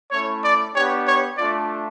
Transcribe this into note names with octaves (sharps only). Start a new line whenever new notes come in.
A3 C#4 E4 C#5
D5
B3 D4 G4 C#5
C#5
A3 D4 F4 D5